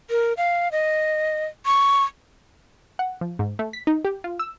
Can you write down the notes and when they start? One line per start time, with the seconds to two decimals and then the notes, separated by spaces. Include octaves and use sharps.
0.10 A#4
0.37 F5
0.72 D#5
1.66 C#6
2.99 F#5
3.21 F3
3.39 G#2
3.59 A3
3.73 B6
3.87 D#4
4.05 G4
4.24 F4
4.39 E6